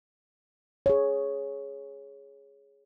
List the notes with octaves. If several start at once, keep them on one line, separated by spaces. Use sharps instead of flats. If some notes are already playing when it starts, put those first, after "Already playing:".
G#4 C#5